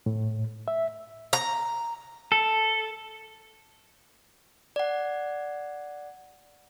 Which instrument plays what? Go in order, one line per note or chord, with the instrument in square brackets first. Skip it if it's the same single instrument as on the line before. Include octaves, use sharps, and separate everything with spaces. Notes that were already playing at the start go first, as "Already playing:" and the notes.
[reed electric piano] A2
E5
[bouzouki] A#5
[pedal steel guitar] A4
[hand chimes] D5 F#5